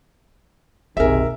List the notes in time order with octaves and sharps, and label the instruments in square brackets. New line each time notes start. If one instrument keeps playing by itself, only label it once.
[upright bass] F#1 B1 [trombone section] C3 D#3 G#4 [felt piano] A#4 E5